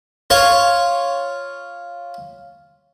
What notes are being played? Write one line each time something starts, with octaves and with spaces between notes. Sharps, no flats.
F4 C#5